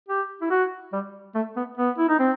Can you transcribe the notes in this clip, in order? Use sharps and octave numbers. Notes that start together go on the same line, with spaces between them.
G4
E4
F#4
G3
A3
B3
B3
E4
D#4
C4